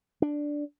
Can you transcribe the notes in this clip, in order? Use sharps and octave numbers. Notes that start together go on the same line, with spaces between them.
D4